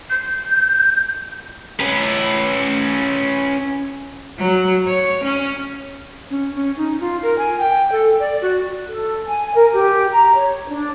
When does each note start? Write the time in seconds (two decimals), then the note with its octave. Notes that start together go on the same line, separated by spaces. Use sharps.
0.10 G6
1.80 C#4 B4
4.39 F#3
4.88 C#5
5.24 C#4
6.31 C#4
6.55 C#4
6.77 D#4
7.00 F4
7.23 A#4
7.38 G#5
7.59 G5
7.92 A4
8.20 D5
8.42 F#4
8.89 A4
9.27 G#5
9.55 A#4
9.73 G4
10.11 A#5
10.34 C#5
10.69 D4